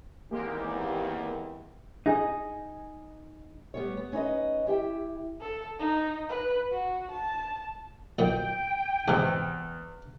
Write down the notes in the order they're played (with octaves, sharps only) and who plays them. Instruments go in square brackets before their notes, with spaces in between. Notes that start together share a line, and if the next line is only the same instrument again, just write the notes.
[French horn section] E2 D#3 C4 [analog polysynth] G#3 A#3 G4
[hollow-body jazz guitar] D#4 G#4
[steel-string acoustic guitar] G3 B3 C#5
B3
C#4 D#4 E4 B4 D#5
E4 G4 E5 G5
[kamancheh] A4
D#4
B4
F#4
A5
[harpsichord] B1 A#2 [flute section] G5
[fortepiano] E2 [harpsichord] G#2 C3